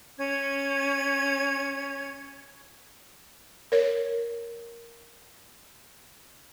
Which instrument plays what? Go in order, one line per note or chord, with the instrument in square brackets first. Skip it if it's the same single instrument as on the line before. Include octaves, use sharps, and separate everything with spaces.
[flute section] C#4 G#6
[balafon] A#4 C#5